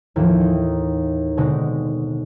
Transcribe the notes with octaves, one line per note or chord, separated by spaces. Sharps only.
D#2 A2 E3 F3
D#4
B2 D3 G#3 C4 D#4